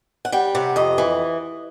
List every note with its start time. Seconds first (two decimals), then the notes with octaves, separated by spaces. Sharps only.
0.25 F#5
0.32 G3 G5
0.55 C3 F#5
0.76 F2 D#5
0.98 E3